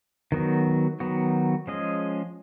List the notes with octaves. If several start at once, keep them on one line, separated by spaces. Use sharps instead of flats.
D#3 F#3 B3 F#4
D#3 F#3 B3 F#4
F3 G#3 C#4 G#4 D#5